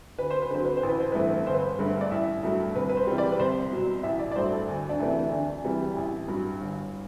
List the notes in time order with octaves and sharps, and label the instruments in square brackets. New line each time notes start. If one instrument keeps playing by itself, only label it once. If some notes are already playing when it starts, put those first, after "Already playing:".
[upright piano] D2 B4
C5
B4
D3 F#3 C5
B4
C5
A1
B4
C5
G2 E3 A3 B4
G1 C5
B4
C5
G2 D3 A3
D5
A1 E5
G2 F#3 A3
C2 B4
B4
C5
C3 E3 G3
D5
B4
C2 C5
B2 F#3
A1 E5
D5
D5
G2 F#3 A3 C5
A4
D2
D4
C3 E3 A3
E4
D2 D4
C3 E3 G3
A1
G2 F#3
G1